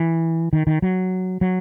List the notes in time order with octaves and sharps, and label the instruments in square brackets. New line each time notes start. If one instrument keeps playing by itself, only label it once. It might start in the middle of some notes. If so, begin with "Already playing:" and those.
Already playing: [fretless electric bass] E3
D#3
D#3
F#3
F#3